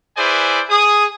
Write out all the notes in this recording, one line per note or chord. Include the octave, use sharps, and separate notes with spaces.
E4 G#4 B4 C5 D5 G#5
G#4 D#6